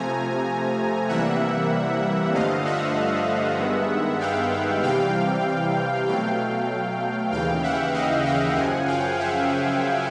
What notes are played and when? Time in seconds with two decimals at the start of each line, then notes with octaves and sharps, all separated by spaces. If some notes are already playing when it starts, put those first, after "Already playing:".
Already playing: C3 F3 A3 G#5 A#5
1.09 C3 E3 G3 A#3 E5 F#5
2.34 G2 D3 F3 A3 D#5 F5
2.65 E5 F#5
3.58 G2 D#3 G#3 B3
4.20 F5 G5
4.83 C3 E3 G3 F5 G5
6.07 B2 F#3 A3 F5 G5
7.31 D#2 C#3 E3 F5 G5
7.63 E5 F#5
7.94 D#5 F5
8.25 F5 G5
8.56 F#2 C#3 F3 F#5 G#5
8.87 F5 G5
9.19 E5 F#5